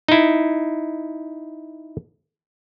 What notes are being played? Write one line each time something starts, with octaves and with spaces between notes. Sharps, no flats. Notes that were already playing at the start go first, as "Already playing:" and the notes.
D#4 E4